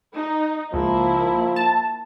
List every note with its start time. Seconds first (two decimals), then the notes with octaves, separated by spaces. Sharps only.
0.14 D#4
0.74 C#2 F3 A#3 E4
1.56 A5